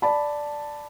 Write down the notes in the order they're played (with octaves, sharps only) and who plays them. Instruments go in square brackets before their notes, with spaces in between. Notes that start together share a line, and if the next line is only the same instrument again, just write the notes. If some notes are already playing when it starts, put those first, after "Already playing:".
[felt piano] D5 A5 B5